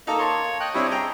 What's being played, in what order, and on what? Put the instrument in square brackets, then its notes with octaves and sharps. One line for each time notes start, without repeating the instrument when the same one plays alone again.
[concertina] A#3 [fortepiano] D#4 A4 A#5
[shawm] C#5 [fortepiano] A5 C6
[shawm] D#5 [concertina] G5 F#6
[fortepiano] G3 C4 D4 [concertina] E4 C#5
[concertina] G#4 [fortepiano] G5 A#5